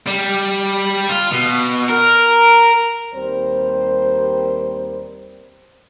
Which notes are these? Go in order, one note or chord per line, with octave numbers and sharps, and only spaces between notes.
G3
F4
B2
A#4
D#2 G3 C4 A#4 C5